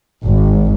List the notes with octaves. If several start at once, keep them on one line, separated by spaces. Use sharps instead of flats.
G#1